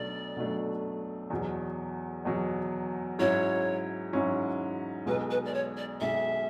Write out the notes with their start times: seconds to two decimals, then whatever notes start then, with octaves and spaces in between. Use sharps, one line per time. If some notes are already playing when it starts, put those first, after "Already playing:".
Already playing: B1 B2 F#3 A3 D4 D5
0.36 B1 B2 F#3 A3 D4
1.30 E2 B2 F#3
2.25 E2 B2 F#3
3.19 G#2 F#3 C#4 E4 C#5
4.13 G#2 F#3 C#4 E4
5.06 B1 B2 G#3 B4
5.30 B4
5.45 D5
5.54 C#5
5.77 D5
6.00 B1 B2 G#3 E5